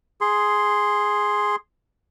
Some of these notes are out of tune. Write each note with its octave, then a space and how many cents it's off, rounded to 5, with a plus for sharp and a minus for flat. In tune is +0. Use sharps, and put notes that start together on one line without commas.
G#4 +0 C6 +0